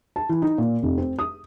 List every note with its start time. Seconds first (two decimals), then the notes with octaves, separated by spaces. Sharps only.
0.16 A5
0.29 E3
0.42 D#4
0.58 A#2
0.83 F1
0.98 C4
1.19 D#6